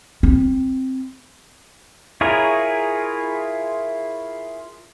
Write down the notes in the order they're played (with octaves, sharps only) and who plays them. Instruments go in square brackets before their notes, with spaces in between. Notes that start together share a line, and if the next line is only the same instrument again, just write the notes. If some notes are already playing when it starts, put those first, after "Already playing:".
[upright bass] C4
[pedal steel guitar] E4 F4 G#4 A#4 C#5